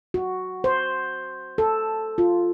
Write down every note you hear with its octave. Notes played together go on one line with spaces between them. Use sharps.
F#4
C5
A4
F4